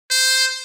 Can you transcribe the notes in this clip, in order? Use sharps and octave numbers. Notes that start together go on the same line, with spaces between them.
C5